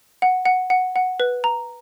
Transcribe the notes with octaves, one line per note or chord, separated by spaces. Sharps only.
F#5
F#5
F#5
F#5
B4
A#5